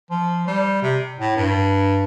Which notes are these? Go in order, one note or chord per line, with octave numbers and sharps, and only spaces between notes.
F3
G3
C3
A2
G2